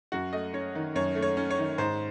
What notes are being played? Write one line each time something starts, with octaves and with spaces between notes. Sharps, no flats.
F#2 F#4
A3 D#5
C#4 C#5
D#3
F#2 C#5
A3
C#5
C#4
C#5
D#3
G#2 C5